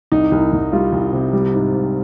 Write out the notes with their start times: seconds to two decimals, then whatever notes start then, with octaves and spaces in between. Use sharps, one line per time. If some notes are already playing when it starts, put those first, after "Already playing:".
0.12 C2 D#4
0.31 C2
0.53 C2
0.72 G3 F4
0.92 C2
1.13 C3
1.33 G3
1.54 G#2
1.74 G#2